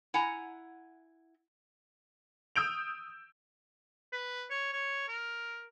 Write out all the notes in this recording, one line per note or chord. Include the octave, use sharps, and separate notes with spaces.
E4 F#5 G#5 A#5
D#6 E6 G6 D7 F7
B4
C#5
C#5
A#4